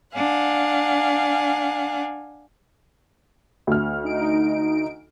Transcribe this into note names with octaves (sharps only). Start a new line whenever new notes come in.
D4 F5 F#5 G#5
D2 F6
D#4 D7